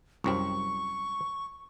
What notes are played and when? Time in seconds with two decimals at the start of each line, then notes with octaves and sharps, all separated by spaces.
0.24 C2 F#2 C4 C#6